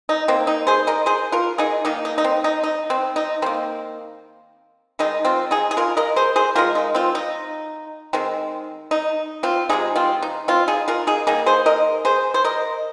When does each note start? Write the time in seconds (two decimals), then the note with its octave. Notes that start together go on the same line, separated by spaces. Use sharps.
0.09 D#4
0.28 D#3 A#3 C4
0.47 D#4
0.67 G#4 C5
0.87 A#4 D#5
1.06 G#4 C5
1.32 F4 A#4
1.58 D#4 G#4
1.85 D#3 A#3 D#4
2.05 D#4
2.18 D#4
2.24 C4
2.44 D#4
2.63 D#4
2.90 C4
3.16 D#4
3.42 D#3 A#3 C4
4.99 D#3 G#3 D#4
5.25 C4 F4
5.51 D#4 G#4
5.71 G#4
5.77 F4 A#4
5.97 A#4 D#5
6.16 G#4 C5
6.36 G#4 C5
6.55 D#3 G#3 F4 A#4
6.75 D#4
6.95 C4 F4
7.15 D#4
8.13 D#3 G#3 C4
8.91 D#4
9.43 C4 F4
9.69 C3 F3 G#3 D#4 G#4
9.96 C4 F4
10.22 D#4
10.48 C4 F4
10.68 D#4 G#4
10.88 F4 A#4
11.07 D#4 G#4
11.27 D#3 A#3 D#4 G#4
11.46 G#4 C5
11.66 A#4 D#5
12.05 G#4 C5
12.34 C5
12.44 A#4 D#5